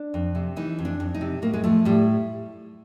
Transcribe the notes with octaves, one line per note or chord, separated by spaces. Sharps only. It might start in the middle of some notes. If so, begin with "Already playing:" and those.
Already playing: D4
F2
C3
E3 D#4
F2
D4
F2
D#4
C3
A2 A#3
G#3
F3 A3
A2 G3